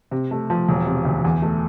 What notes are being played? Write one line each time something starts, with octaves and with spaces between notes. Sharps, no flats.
C3
A3
F3
E1
C3
D2
E2
A3